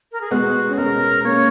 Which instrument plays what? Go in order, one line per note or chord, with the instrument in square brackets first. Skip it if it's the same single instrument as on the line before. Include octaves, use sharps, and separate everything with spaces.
[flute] A#4
G#4
[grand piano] G#3 B3 [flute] F#4
[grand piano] C#4
[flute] G#4
[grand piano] G#3 B3 [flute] A#4
[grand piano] A#3 C#4 [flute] C#5